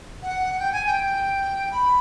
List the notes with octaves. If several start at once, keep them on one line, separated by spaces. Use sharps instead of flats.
F#5
G5
G#5
G5
B5